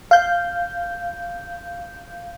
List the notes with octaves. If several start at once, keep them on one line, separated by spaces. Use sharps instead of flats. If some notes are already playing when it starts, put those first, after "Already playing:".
F5 G6